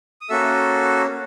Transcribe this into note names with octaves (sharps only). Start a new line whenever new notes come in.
D#6
A#3 C#4 F#4 A4 E5 E6